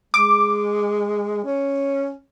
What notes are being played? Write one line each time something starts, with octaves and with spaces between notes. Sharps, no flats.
G#3 D6
C#4